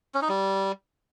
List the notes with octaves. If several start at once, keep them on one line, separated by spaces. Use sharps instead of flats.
C#4
D#4
G3